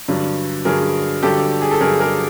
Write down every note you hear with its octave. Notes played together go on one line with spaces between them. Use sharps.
G2 D3 F#3
G2 D3 F#3 G#4 A#4
G2 D3 F#3 G4 A4
G#4
A4
G2 D3 F#3 G#4 A#4
G#4 A#4